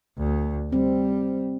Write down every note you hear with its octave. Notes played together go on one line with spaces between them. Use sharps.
D2
G3 C4